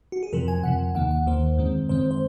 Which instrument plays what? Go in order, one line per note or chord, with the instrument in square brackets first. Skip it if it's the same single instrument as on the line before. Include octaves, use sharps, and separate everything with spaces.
[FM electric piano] F#4
G#4
F2 C3 F3 A#4
G#5
F2 C3 F3 F#5
D#2 D#3 A#3 F#5
F#5
D#2 D#3 A#3 C5
F#2 D#3 G#3 C4
F#2 D#3 G#3 C4 C5
C5